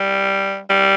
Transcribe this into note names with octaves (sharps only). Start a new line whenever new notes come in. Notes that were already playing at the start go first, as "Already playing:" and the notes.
Already playing: G3
G3